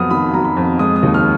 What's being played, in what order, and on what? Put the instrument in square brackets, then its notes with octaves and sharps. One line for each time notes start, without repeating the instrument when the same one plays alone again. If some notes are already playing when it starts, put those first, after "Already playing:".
Already playing: [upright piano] F2 F#3 B3 D#6 F6
D#3 B5
F#3 A#5
B5
F2
G#3 D#6
D#6
D#2
F6